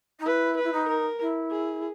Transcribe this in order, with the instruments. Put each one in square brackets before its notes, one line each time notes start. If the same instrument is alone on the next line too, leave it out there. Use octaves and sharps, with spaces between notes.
[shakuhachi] D#4
[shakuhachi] E4 [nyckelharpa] B4
[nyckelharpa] B4
[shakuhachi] E4
D#4
[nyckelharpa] A#4
[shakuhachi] E4
[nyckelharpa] G#4